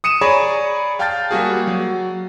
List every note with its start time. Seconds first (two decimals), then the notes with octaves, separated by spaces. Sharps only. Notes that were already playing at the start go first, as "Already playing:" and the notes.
0.04 D#6 C#7 D#7 E7
0.21 G#4 C#5 D5 A#5 B5 C#6
0.99 F5 G5 A5 F6 G6 A6
1.31 G3 A#3 F#4 G#4
1.67 F#3